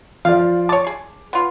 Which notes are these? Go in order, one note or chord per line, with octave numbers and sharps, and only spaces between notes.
F3 F4 D5 F5
C#5 A5 D6
G#4
B3 F4